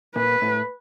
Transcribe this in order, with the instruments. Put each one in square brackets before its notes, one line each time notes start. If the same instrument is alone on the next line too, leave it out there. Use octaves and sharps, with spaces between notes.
[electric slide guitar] A#2 [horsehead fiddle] B4
[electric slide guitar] A2